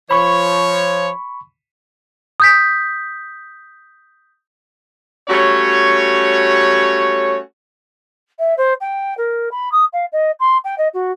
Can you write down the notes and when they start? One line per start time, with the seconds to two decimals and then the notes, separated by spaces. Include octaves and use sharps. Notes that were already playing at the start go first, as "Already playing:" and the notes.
0.11 F3 C#5 B5 C#6
2.40 D#6 G6 B6
5.29 G3 A3 C#4 F#4 C#5
8.39 E5
8.57 C5
8.81 G5
9.17 A#4
9.51 B5
9.72 D#6
9.93 F5
10.12 D#5
10.40 C6
10.64 G5
10.78 D#5
10.94 F#4